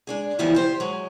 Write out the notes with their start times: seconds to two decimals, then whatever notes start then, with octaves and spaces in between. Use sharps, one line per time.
0.07 G#3 D4 G#4
0.39 C#3 E3 F3 G3 B3 E4
0.55 G4 C5
0.80 F#3 G#3